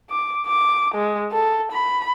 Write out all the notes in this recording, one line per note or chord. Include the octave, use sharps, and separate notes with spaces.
D6
D6
G#3
A4
B5